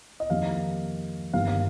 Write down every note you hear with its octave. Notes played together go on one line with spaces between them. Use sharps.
D#5
F2 D#3 G3 A#3 F5
G1 G2 D#3 G3 A#3 F5
F5